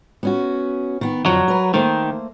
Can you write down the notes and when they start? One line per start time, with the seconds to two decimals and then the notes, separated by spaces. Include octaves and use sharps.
0.23 B3 C#4 F#4
1.01 D#3 B3
1.26 F2 D3 F3 F#3
1.48 A#4 B4
1.74 D#3 A3 A#3 C5